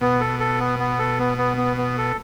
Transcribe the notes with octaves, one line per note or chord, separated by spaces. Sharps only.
B2 B3
A4
A4
B3
B3
A4
B3
B3
B3
B3
A4